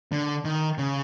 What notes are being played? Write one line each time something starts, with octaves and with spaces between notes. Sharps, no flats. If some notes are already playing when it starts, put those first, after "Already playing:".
D3
D#3
C#3